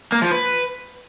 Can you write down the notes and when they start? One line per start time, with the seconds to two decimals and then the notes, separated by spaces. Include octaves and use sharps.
0.12 A#3
0.22 F3
0.31 B4